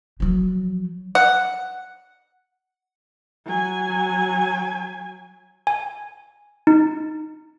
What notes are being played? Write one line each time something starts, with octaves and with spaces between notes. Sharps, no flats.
F3 F#3
F#5
F#3 G#5
G#5
D#4